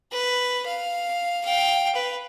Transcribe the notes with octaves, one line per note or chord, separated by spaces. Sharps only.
B4
F5
F5 G5
B4